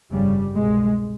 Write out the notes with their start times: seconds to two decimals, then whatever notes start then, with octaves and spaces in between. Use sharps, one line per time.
0.11 G1 F2 C#3 G3
0.56 C2 B2 G#3